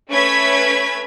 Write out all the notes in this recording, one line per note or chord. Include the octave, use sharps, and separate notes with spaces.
A3 C#4 B4 G#6 B6